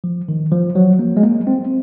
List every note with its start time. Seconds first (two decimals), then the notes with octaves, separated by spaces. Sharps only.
0.04 F3
0.29 D#3
0.52 F3
0.75 F#3
0.99 A#3
1.17 G#3
1.23 A#3
1.47 C4